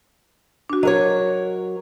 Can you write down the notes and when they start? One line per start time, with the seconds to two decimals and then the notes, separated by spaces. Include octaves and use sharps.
0.70 D4 F#4
0.83 F#3 A#4 C#5 D#5